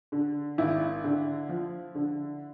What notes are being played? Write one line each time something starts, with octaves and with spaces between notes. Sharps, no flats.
D3
G#1 E4
D3
F3
D3